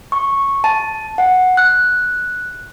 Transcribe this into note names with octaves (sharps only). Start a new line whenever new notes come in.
C#6
A5
F#5
F#6